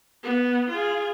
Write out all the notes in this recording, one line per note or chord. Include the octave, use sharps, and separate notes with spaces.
B3
F4 G#4